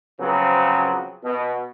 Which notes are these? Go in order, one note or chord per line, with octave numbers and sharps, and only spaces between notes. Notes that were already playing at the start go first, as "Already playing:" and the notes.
C#3 F3 F#3 B3 C4
B2